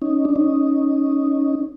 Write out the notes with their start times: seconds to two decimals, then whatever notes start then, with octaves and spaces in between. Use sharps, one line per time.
0.02 C#4 D#4
0.25 D4
0.36 C#4 D#4